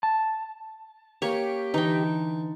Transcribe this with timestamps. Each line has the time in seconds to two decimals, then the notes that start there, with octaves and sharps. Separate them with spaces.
0.03 A5
1.22 A#3 C#4 G4 A#4 C#5
1.74 D3 E3 D#4 G5